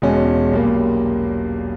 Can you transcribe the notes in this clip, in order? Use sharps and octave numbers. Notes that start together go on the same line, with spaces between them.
E1 E2 B2 G#3 C#4
B1 A#2 G3 A#3